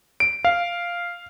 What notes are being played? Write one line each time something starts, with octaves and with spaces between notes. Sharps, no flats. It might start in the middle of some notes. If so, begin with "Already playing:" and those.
D7
F5